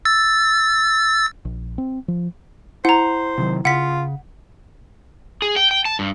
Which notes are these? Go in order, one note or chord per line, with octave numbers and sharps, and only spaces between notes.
E6 A6
A#1
C4
F3
E4 C5 F#5 A#5
C3 D#3 F#3
C#3 F4 F#5 B6
G#4
G5
G5
A5
G2